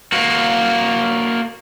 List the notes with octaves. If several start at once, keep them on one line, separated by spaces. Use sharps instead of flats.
A#3 F#4